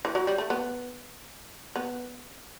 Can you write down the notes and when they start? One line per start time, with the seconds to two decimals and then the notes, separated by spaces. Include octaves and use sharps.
0.05 E3
0.15 F#3
0.27 G3
0.38 A3
0.50 B3
1.76 B3